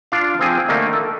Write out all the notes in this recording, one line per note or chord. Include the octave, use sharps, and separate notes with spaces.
D4 F4 D5 F5
F3 C4 G#4
D3 D#3 A3 A#3 D#4
A4